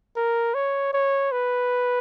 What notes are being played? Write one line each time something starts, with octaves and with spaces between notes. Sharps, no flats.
A#4
C#5
C#5
B4